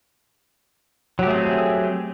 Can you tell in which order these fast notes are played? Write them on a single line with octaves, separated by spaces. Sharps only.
F#3 G4 A3 G#4 C4